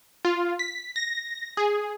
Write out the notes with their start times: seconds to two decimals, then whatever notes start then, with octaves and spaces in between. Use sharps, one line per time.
0.25 F4
0.59 B6
0.96 A#6
1.57 G#4